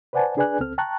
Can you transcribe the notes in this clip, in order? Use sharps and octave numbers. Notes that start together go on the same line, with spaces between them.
B4 C5 D5 F#5 G#5 A5
D4 G#4 B4 D5 G#5 F#6
C#2 C4 A4 F6
G5 A5 A#5 C#6 F#6